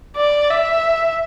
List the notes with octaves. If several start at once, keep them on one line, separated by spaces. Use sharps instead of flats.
D5
E5